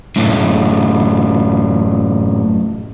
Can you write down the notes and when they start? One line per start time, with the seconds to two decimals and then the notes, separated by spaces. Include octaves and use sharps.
0.16 F#2 A2